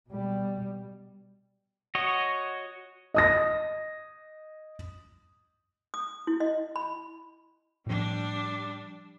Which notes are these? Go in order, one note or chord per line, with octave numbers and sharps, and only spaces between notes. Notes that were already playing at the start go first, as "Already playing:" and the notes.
B2 G3
F#4 C#5 D#5
D#5 D#6 A#6
D#6
E4
D#5
B5
A2 F3 G3 D4